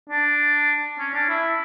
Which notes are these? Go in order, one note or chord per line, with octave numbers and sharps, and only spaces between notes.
D4
C#4
D4
E4